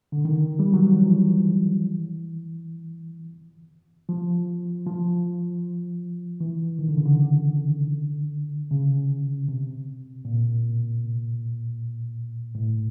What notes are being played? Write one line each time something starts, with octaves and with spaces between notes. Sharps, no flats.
D3
D#3
G3
F#3
F3
E3
F3
F3
E3
D#3
D3
C#3
D3
C#3
C3
A#2
A2